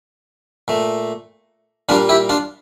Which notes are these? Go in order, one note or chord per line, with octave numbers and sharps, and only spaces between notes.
A#2 A3
A#2 G3 A#3 D4 F4
E4 G4
D4 F4